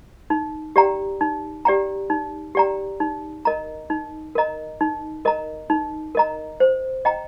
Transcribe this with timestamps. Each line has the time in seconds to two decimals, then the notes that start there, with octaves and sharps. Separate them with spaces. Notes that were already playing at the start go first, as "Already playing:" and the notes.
0.30 D#4
0.76 G4 D5 G5 A#5
1.21 D#4
1.65 G4 D5 G5 A#5
2.10 D#4
2.55 G4 D5 G5 A#5
3.00 D#4
3.45 A#4 D#5 A#5
3.90 D#4
4.35 A#4 D#5 A#5
4.81 D#4
5.25 A#4 D#5 A#5
5.70 D#4
6.15 A#4 D#5 A#5
6.60 C5
7.05 D#5 G5 A#5